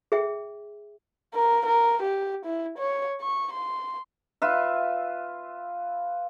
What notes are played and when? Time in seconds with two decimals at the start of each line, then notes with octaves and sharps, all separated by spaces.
0.12 G#4 E5 G5
1.35 A#4
1.66 A#4
2.03 G4
2.45 E4
2.78 C#5
3.21 C#6
3.53 C6
4.42 F4 B4 E5